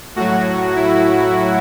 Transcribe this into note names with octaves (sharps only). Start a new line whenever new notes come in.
A2 F#3 F#4
E4